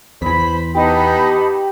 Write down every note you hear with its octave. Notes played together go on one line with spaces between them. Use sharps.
E2 E3 C5 B5 B6
B3 D#4 G4 A5 B5